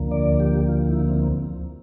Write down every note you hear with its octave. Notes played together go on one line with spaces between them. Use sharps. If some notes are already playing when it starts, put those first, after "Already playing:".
Already playing: D2 D3 F3 A#3
D5
G4
F4
E4
C4